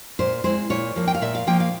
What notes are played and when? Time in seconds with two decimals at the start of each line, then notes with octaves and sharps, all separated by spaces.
0.19 A#2 C5
0.44 G#3 C4 E4 C5
0.70 A#2 C#5
0.96 F3 A#3
1.08 G5
1.15 F5
1.22 A#2 E5
1.35 F5
1.47 F3 A#3 G5
1.60 F5